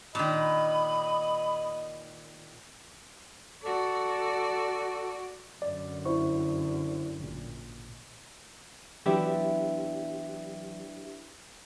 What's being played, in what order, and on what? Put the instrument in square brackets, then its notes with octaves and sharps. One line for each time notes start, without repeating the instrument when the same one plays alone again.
[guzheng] A#2 D#3 [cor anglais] D#5 [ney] B5
[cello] F#4 D5 [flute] A4
[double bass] F#2 D3 [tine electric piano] D5
[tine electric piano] E4 C5 C#6
A1 A#2
[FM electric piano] E3 F#3 [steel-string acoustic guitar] B3 D4 E4 [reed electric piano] G4 E5